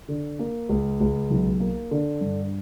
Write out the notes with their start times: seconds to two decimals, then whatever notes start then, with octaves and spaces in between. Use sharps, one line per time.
0.08 D3
0.39 A#3
0.69 C#2
1.00 C#2
1.30 B1
1.60 A#3
1.91 D3
2.21 G2